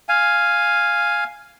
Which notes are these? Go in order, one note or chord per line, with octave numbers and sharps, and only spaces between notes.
F5 G#5